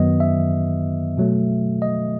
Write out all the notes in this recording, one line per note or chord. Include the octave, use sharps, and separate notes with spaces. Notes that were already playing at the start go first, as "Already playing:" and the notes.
Already playing: F#2 D#3 F#3 B3 D#5
E5
B2 F#3 A3
D#5